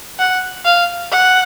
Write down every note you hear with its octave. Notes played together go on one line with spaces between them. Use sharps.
F#5
F5
F#5